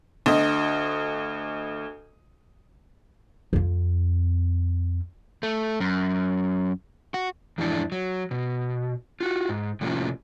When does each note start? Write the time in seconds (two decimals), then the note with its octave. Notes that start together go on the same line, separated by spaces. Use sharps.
0.26 D2 D#5
3.53 F2 C4
5.43 A3
5.80 F#2
7.14 F#4
7.58 F2 G#2 E3 G#3 D4 E4
7.92 F#3
8.31 B2
9.21 F4 F#4
9.49 G#2
9.81 A2 C3 F3 A#3 C#4 F4